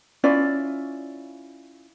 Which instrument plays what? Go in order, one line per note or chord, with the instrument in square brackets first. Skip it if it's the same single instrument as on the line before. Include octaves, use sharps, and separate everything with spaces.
[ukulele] C#4 E4 F4 D5